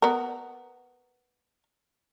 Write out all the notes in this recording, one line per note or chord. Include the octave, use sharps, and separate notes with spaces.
B3 A#4